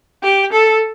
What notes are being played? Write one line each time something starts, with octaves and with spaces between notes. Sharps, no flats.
G4
A4